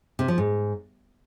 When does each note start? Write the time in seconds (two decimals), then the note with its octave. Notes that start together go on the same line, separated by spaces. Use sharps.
0.19 C3
0.28 F3
0.38 G#2